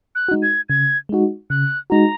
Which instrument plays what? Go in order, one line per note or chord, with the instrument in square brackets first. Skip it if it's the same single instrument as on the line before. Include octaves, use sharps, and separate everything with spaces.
[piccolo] F#6
[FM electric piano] G#3 D#4 F#4
[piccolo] G#6
[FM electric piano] C#3 [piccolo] G#6
[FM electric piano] G#3 D#4 F#4
[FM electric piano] C#3 [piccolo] F#6
[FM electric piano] G#3 D#4 F#4 [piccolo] A#5